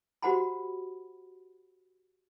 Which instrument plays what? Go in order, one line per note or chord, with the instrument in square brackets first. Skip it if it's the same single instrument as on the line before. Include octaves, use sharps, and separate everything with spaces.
[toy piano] F#4 G4 C5 F#5 A#5 B5